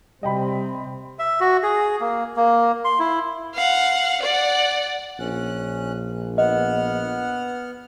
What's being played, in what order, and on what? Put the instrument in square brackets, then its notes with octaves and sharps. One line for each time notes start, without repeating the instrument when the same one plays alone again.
[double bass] C3 C4 [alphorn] G3 [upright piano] D#5 G5 B5
[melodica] E5
F#4
G#4
A#3
A#3
C6
E4
[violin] F5 F#5
D5 F#5
[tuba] A#1 [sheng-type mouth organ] C#4 F#6
[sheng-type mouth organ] B3 F#5 F6 [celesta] D#5